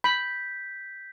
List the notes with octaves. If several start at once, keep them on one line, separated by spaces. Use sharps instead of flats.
B5 G6 B6